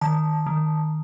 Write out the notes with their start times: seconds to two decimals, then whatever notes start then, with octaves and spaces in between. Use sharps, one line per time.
0.01 D#3 A5
0.46 D#3